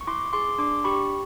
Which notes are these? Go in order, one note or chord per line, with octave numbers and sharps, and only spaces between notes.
C#6
E4 C6 D6
G#4 C6 D6
D4 C6 D6
G4 B5 C#6